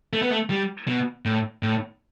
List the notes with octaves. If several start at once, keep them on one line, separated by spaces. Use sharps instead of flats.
A3
B3
A3
G3
B2
A2
A2